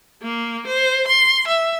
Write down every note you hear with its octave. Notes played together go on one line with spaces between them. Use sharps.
A#3
C5
C6
E5